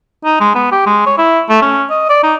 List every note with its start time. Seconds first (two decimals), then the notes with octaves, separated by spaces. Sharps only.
0.25 D#4
0.41 G#3
0.55 B3
0.72 G4
0.86 G#3
1.06 C#5
1.18 E4
1.49 A3
1.62 C#4
1.90 D#5
2.09 D5
2.23 D#4